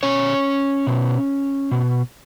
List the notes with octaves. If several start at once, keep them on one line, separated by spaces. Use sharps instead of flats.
B2 C#4 C#5
B2
B2